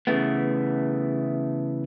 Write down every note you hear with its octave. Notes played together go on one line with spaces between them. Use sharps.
C#3 E3 A3 B3